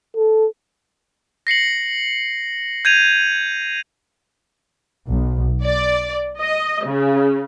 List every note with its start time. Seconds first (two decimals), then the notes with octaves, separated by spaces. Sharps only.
0.16 A4
1.47 A#6 C7 C#7 F#7
2.85 G6 G#6 D#7 F7
5.08 B1
5.61 D5
6.40 D#5
6.86 C#3